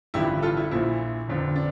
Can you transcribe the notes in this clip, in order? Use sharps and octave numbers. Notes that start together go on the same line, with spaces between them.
A1 G2 D3 F3 E4 G4
F4 A4
E4
A#1 A#2 F3 E4
G1 F2 D3
D4